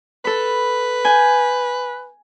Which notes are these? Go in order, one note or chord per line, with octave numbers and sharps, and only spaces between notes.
A4 B4 B5
G#5 G6